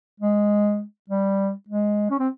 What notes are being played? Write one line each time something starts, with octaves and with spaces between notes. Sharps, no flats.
G#3
G3
G#3
C#4
C4